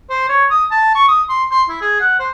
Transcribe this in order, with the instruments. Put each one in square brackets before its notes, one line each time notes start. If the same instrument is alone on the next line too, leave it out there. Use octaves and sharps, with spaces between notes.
[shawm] C5
C#5
D#6
A5
C#6
D#6
C6
C6
E4
G#4
F#5
C5